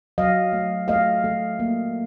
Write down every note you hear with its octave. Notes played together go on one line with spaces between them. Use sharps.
F#3 D#5 F5
A3
A3 D#5 F5
A3
A#3